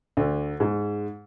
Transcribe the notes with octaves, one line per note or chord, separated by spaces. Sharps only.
D2
G#2